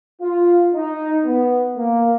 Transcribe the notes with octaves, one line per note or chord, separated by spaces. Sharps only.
F4
D#4
B3
A#3